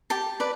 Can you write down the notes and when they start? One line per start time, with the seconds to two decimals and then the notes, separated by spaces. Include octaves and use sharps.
0.10 G4 A5
0.40 B4 D5